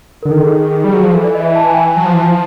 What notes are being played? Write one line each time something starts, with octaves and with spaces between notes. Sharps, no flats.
D3 A#4
D#3 A4
G#4
G#4
G#4
G3
F#3 G#4
F3
E3 A4
D5
D#5
E5
A5
G#5
G5
G#5
F#3 A5
F3
E3
F3 A5